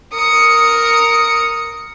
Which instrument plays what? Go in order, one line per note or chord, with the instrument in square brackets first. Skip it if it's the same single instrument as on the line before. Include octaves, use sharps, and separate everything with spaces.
[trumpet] A#4 [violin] D#6 C#7